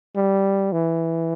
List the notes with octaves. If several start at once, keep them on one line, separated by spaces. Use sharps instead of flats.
G3
E3